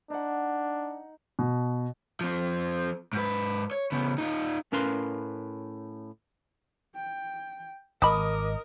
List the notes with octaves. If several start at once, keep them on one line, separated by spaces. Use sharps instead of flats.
D4 D#4 F#5
B2
F3 C4
G#2 B4
C#5
C#3 B3
D#4 F4
A2 C#4 A#4 B4 F5 C6
G5
G#1 A#4 D#5 A5 B5 D6 D#6